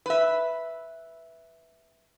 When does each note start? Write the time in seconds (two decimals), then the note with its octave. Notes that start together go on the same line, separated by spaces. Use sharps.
0.06 B4 E5